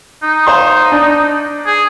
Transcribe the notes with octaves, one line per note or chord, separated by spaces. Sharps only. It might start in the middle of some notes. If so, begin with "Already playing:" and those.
D#4
C5 F5 C6
D4
G#4